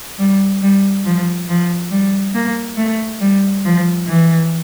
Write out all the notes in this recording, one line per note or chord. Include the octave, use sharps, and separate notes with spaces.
G3
G3
F3
F3
G3
A#3
A3
G3
F3
E3